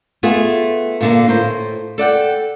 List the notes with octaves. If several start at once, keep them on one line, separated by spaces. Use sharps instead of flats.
A3 B3 F4 G#4
A#2 D3 A#3
A2 C5
A4 D5 F#5 G5